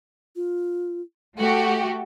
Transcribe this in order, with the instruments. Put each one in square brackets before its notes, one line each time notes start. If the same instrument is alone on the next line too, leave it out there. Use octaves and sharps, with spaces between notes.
[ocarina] F4
[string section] A3 F#4 G4 [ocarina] A4